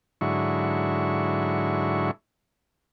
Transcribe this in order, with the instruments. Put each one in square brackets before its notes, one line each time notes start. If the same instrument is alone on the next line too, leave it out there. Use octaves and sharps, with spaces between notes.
[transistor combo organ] G#2 D3 F#3 E4 C#6